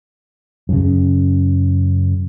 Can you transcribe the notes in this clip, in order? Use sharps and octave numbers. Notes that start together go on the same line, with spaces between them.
F#2 C#3